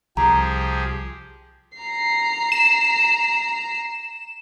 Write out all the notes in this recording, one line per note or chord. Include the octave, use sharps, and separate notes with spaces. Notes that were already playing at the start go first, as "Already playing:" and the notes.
C2 F3 G4 G#4 A#5
A#5 C7
E7